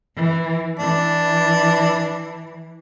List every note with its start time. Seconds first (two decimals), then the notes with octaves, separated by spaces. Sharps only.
0.16 E3
0.80 E3 D4